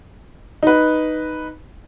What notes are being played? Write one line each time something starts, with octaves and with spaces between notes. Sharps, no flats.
D#4 B4